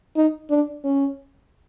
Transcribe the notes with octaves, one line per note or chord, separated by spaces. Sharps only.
D#4
D4
C#4